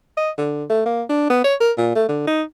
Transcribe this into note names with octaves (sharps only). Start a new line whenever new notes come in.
D#5
D3
A3
A#3
D4
B3
C#5
A#4
A#2
A3
D3
D#4